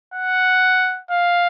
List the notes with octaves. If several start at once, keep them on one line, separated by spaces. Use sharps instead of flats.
F#5
F5